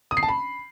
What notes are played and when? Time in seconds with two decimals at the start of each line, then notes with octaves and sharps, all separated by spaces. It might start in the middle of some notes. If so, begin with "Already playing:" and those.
0.11 D#6
0.17 C7
0.23 A5
0.29 B5